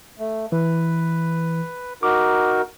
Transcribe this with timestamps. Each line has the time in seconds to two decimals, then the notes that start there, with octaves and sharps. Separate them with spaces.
0.19 A3
0.52 E3 B4
2.03 D#4 F#4 A#4 D6